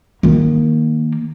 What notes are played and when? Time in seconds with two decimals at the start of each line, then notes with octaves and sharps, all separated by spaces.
0.23 D#3 A#3